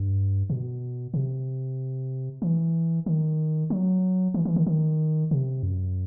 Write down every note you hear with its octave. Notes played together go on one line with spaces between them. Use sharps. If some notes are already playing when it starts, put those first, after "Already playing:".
Already playing: G2
B2
C3
E3
D#3
F#3
E3
E3
D#3
D#3
C3
F#2